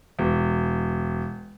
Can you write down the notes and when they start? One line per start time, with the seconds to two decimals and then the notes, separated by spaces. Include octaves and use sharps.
0.19 E1